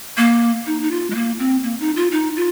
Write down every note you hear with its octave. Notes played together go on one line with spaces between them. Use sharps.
A#3
D#4
D#4
F4
G#3
A#3
C4
A#3
D#4
F4
D#4
F4